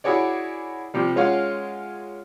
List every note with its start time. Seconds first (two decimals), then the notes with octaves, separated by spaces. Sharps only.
0.04 E4 F#4 G#4 C#5 D5
0.94 C3 F3 G3
1.16 G#3 C#4 F4 C#5 F5 F#5